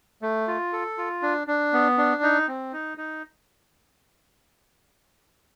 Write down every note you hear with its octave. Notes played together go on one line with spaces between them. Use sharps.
A3
F4
A4
F4
D4
D4
B3
D4
D#4
C4
D#4
D#4